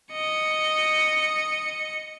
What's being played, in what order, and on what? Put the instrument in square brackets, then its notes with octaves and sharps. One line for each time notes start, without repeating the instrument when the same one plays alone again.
[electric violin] D#5 C#7